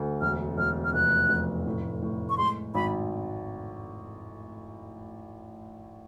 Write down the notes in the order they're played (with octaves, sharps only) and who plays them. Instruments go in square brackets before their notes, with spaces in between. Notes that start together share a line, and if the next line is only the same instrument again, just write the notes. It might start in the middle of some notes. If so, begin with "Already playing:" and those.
Already playing: [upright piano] D2 A3
[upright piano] E1 [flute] F6
[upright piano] E1 [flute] F6
[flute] F6
[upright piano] F1 [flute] F#6
[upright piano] F1
A2
A2
[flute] C#6
[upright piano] G#3 [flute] C6
[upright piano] G#1 [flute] B5